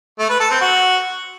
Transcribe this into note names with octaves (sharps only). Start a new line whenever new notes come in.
A3
B4
A4
C4
F#4